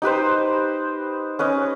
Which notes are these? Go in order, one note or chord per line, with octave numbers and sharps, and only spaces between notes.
D#4 G4 B4 C5
C#4 B4 D#5